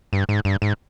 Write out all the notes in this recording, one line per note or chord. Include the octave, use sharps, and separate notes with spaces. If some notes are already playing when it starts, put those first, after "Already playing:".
G2
G#2
G2
G#2